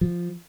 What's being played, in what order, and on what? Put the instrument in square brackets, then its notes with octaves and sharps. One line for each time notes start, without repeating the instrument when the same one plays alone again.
[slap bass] F3